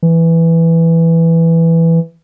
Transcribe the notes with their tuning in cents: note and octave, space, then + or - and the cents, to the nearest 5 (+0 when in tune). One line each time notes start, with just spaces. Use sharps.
E3 +5